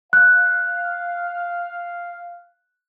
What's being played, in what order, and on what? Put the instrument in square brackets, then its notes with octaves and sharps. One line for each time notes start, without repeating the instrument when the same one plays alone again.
[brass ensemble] F5 [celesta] F#6